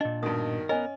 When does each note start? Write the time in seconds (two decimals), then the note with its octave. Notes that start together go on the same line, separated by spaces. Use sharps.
0.01 A#2 D4 D#5
0.23 G2 B2 D#3 D#6
0.69 B3 C#4 A#4 D#5 G#5